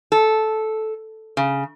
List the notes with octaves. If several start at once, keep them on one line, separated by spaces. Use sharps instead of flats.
A4
C#3